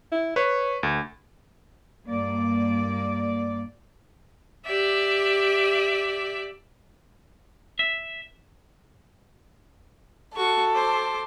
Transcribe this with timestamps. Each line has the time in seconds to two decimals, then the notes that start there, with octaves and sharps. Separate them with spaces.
0.12 E4
0.36 B4 C#5
0.83 D2
2.06 G2 A#3 D5
4.66 G4 D5 E5
7.79 E5
10.36 F#4 A4 C#6
10.74 C5 D6